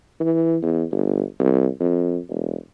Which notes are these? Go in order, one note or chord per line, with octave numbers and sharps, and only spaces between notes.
E3
E2
G1
C2
F2
E1